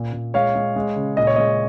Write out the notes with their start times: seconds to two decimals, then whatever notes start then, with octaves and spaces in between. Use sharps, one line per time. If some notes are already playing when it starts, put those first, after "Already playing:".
Already playing: A#2
0.13 A#2
0.34 G#3 C#5 F5
0.55 G#3
0.76 G#3
0.96 C#3
1.17 A#2 D#5
1.27 C#5
1.36 G#3 D#5